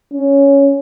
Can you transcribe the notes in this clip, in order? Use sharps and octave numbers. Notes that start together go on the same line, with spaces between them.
C#4